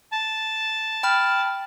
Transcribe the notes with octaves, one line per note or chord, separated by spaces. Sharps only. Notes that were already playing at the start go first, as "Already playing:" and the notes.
A5
G5 B5 F6